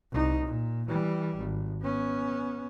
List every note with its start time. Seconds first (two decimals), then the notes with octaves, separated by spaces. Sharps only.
0.12 C2 D#4
0.45 A#2
0.88 E3 G3
1.38 G#1
1.82 B3 C#4